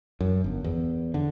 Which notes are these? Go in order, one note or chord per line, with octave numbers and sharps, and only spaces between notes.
F#2
G1
E2
D3